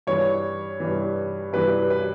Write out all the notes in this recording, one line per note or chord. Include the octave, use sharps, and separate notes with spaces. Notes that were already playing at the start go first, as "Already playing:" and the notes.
G2 E3 C#5
G2 E3
G2 E3 B4
B4